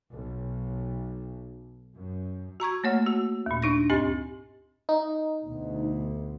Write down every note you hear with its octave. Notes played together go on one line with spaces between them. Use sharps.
B1
F#2
F#4 A#5 C#6 G#6
A3 A#3 C#5 F#5 F6
F#4
D#2 A#2
D4 D#4 A#6
D2 G2 C4 G4 C6 A6
D#4
D2 B2